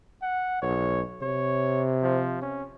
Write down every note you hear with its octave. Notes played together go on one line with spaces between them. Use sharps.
F#5
B1 C#5
C3 C#5
F3
C#4